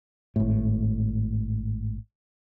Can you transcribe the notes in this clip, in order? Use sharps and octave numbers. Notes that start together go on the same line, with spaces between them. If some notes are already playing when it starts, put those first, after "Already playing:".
G#1 A2